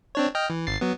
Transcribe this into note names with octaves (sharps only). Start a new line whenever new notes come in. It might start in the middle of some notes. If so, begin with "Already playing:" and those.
C4 D4 C#5
D#5 G5 F6
E3
G#1 A6 C7
F#3 B3